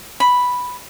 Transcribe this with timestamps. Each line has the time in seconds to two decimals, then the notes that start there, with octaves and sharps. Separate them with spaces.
0.20 B5